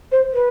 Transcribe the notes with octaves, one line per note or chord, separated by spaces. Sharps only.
C5
B4